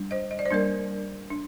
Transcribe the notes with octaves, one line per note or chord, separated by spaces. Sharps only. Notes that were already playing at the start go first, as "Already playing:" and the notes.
Already playing: G3 D4
C5 D#5
D#5
D5
C5
G3 A#3 D4 A#4 D5
D4